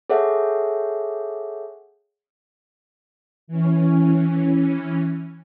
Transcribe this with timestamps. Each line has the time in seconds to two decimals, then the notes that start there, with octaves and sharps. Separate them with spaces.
0.10 G#4 A4 C#5 E5 F#5
3.48 E3 C#4